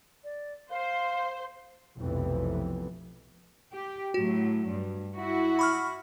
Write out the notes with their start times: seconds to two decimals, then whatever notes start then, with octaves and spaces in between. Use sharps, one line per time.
0.24 D5
0.70 C5 F5
1.96 F1 B1 F2 C3 E3 B3
3.73 G4
4.14 A2 F#3 F#4
4.68 G2
5.15 E4 F#4
5.59 B5 C#6 F6